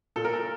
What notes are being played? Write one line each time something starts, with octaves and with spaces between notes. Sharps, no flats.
A#2 A4
A#4
A4